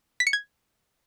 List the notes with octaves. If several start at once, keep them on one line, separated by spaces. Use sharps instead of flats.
B6
C#7
G#6